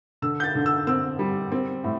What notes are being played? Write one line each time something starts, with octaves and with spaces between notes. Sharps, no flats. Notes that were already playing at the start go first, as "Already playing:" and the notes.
D3 E6
G6
A6
D3
E6
C4 E6
G3
C4
A2